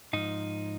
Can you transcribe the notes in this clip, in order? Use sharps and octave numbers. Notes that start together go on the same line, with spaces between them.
G#2 F3 D#4